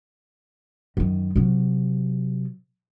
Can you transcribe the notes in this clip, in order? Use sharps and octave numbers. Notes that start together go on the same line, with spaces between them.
F#2 D#3
C3 F#3